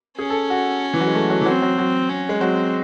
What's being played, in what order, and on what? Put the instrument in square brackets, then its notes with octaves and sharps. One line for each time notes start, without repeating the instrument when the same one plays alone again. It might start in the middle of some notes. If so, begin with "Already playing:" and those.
[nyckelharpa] C#4 [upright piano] G#4
[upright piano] A4
F#4
E3
F#3
G#3
A3
F#3
E3
[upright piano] F#3 [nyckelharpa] C4
[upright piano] F#3
F#3
[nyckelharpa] C#4
[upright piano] G#3
[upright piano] F#3 [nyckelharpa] C4